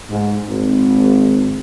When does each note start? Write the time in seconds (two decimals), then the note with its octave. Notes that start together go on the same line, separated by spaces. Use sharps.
0.10 G#2
0.49 G#1